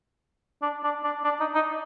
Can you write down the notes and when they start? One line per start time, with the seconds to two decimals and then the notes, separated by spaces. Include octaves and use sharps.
0.62 D4
0.83 D4
1.04 D4
1.24 D4
1.40 D#4
1.55 D#4